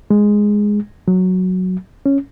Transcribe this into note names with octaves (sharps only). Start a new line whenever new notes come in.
G#3
F#3
C#4